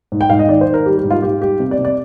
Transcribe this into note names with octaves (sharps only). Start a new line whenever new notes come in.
G#2
G5
G#2 F5
D#5
D#3 D5
C5
D#3
A#4
G3 G4
G4
G#2
F4
G#2 G4
G3 G4
C3
D5
C3
D5